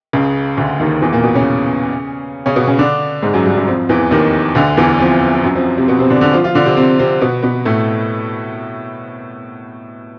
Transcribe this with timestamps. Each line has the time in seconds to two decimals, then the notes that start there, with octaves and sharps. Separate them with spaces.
0.13 C#2 C#3
0.57 D2 D3
0.80 D#2 D#3
1.02 E2 E3
1.12 A#2 A#3
1.24 B2 B3
1.35 C#3 C#4
2.46 C#3 C#4
2.56 B2 B3
2.67 C#3 C#4
2.78 D3 D4
3.22 G#2 G#3
3.34 F#2 F#3
3.45 G2 G3
3.57 F#2 F#3
3.67 F2 F3
3.89 E2 E3
4.11 D#2 D#3
4.55 D2 D3
4.77 E2 E3
4.99 F2 F3
5.34 F3
5.44 F#2 F#3
5.55 F2 F3
5.77 C3 C4
5.88 B2 B3
5.99 C3 C4
6.10 D3 D4
6.21 D3 D4
6.32 F3 F4
6.44 F3 F4
6.55 D3 D4
6.66 C3 C4
6.77 C3 C4
6.99 C3 C4
7.22 B2 B3
7.42 B2 B3
7.65 A2 A3